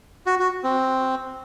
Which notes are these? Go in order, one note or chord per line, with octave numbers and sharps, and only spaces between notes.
F#4
F#4
C4